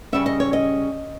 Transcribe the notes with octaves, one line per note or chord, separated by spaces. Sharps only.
C#3 G3 C#4 E5
D#5
C#5
D#5